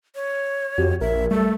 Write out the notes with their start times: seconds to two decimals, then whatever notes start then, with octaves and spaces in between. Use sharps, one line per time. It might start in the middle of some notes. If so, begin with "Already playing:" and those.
0.15 C#5
0.78 F2 F#4 G4
1.01 A#1 A#4 E5
1.31 G3 A3 A4